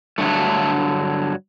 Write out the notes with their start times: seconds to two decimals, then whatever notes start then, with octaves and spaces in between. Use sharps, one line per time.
0.18 G2 D3 F#3 A3